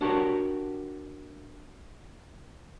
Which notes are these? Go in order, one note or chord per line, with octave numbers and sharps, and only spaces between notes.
D4 F#4 G4 A#4 C#5